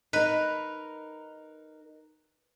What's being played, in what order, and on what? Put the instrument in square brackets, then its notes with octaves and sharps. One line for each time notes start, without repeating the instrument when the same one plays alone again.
[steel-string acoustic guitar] D#4 A#4 [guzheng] B4